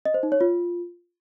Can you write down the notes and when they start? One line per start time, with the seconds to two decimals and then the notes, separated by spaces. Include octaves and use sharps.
0.05 D#5
0.14 C5
0.23 D#4
0.32 C#5
0.41 F4